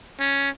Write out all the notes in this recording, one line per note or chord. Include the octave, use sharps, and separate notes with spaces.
C#4